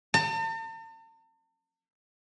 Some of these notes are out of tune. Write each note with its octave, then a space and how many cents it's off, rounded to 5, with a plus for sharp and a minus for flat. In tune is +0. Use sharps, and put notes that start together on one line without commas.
A5 +45